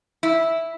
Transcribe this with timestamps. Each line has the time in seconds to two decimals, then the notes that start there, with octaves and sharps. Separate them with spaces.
0.23 E4